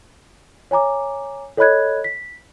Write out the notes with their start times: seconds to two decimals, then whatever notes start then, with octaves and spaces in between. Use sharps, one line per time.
0.71 C#5 G#5 A#5 D6
1.57 A4 C#5 D#5 B5 F#6 G#6
2.04 B6